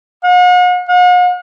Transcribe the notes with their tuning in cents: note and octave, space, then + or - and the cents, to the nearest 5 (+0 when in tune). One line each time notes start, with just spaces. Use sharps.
F#5 -45
F#5 -45